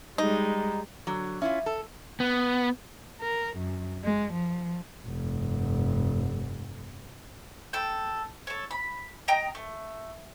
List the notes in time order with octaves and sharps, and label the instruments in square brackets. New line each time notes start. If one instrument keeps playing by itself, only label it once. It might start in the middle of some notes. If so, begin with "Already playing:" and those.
[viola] G3 G#3 [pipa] D#4
[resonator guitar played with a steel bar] D3 F#3
[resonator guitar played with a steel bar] C#4 E4 F4 [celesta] E5
[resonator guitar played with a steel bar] A4
[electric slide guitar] B3
[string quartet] A#4
F#2
G#3
F3
[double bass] F1 G2
[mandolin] A4 G5
A4 C#5
B5
D#5 G5 A#5
A3